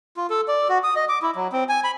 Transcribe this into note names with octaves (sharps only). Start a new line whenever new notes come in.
F4
A4
D5
F#4
D#6
D#5
D6
E4
F#3
C4
G#5
B5